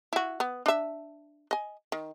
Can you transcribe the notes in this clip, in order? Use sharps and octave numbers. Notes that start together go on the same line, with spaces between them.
E4 F#4
B3
D4 E5
D#5 G#5
D#3